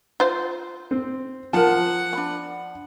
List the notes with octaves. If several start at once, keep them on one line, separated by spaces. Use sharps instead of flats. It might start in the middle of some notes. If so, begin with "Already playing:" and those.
F4 C5
C4
F3 A#4 F#5 A5
D4 B5